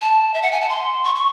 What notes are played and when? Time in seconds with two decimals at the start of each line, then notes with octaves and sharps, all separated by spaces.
0.01 A5
0.34 E5
0.42 F#5
0.52 G#5
0.61 A5
0.69 C6
1.04 C#6
1.15 C#6